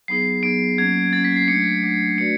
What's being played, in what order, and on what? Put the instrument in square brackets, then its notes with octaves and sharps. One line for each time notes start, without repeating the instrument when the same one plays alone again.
[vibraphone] F#3 B3 D#4 G#4 [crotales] C7
[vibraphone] F#3 B3 D#4 G#4 [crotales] D7
[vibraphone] F#3 A#3 C#4 [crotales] G#6
[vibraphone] F#3 A#3 C#4 [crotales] A6
[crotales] B6
C7
[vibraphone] F#3 A3 D4 [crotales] C#7
[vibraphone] F#3 A3 D4
[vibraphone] A3 D4 F#4 B4 D5 [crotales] C#7